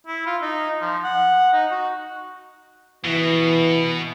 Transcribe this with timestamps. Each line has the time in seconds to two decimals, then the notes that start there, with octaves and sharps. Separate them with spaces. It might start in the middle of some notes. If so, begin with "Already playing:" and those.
0.07 E4
0.26 F4
0.42 D#4
0.82 F3
1.04 F#5
1.53 D#4
1.71 F#4
3.05 B2 E3